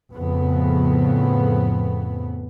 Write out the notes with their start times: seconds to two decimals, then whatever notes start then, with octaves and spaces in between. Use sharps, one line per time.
0.13 F2 A2 C#3 B3